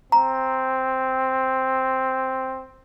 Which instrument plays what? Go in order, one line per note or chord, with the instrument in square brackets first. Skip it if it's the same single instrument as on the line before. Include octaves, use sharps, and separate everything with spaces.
[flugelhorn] C4 [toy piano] A#5